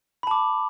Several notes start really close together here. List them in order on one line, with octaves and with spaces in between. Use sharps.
B5 A5 D6